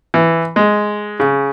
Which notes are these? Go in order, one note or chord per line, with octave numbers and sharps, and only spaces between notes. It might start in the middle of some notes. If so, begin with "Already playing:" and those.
E3
G#3
C#3